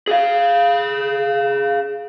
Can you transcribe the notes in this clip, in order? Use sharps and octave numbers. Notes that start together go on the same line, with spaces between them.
G#4 F5